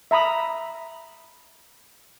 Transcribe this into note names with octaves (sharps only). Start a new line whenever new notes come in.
E5 A#5 B5 D#6